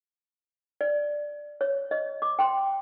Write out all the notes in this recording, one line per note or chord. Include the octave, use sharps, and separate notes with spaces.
D5
C#5
D#5
D6
G5 C6